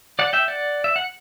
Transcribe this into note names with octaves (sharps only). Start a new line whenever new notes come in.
D5 F#5
E5 G5
D5 F#5
E5
F#5